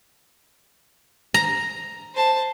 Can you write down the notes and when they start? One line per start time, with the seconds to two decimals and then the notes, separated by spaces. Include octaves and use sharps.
1.34 A#5
2.14 C5 A5